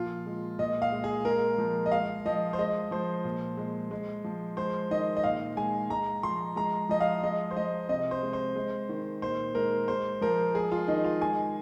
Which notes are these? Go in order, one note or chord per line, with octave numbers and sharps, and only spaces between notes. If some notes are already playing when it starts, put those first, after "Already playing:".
Already playing: A#2 F3 F4
G#3
A#2 D#5
F5
G#3
G#4
G#3 A#4
F3
D#5
G#3 F5
F3 D#5
C5
G#3 D#5
F3 C5
A#2
G#3
G#3
F3
G#3 C5
D#3 D#5
D#5
A#2 F5
G#3 G#5
G#3 A#5
F3 C6
G#3 A#5
F3 D#5
F5
G#3 D#5
C5
F3 D#5
C3 D#5
C5
G#3
C5
G#3
D#3
A#2 C5
G#3 A#4
G#3 C5
F3 A#4
G#3 G#4
F4
D#3 D#4
F4
G#3 G#5